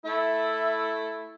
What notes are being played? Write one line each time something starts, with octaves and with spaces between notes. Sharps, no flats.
A3 E4